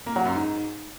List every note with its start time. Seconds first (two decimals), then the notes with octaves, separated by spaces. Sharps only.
0.06 A#3
0.16 F#3
0.25 F#2
0.35 G#2